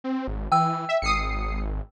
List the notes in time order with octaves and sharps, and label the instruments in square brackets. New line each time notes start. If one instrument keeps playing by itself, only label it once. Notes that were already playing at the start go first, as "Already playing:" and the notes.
[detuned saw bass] C4
G#1
[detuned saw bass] E3 [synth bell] G5 E6
[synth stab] E5
[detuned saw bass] G#1 [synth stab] D#6 C7 C#7